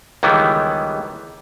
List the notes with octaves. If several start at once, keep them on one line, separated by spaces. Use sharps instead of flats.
C#2 D#3 E3 G3 B3